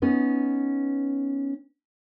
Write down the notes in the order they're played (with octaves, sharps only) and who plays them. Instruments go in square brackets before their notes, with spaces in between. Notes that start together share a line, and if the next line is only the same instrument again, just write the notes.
[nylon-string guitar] B3 C#4 D#4